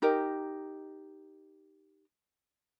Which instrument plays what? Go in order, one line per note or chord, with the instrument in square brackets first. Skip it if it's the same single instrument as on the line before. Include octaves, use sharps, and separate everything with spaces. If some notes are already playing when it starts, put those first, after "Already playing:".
[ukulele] D#4 G4 A#4 D#5